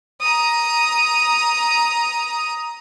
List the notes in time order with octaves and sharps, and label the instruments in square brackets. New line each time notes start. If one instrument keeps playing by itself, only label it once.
[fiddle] A#5 D#6